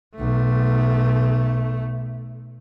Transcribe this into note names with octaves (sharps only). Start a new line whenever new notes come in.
B1 A3